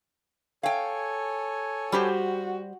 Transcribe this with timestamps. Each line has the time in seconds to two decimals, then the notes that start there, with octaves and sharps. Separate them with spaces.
0.63 A4 C#5 F5 G5 G#5
1.92 G3 F#4 G4 C5